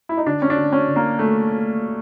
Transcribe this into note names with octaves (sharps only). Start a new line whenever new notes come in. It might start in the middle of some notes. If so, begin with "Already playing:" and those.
E4
D#4
D3 D4
C#4
D4
D3
C#4
D3
A#3
A3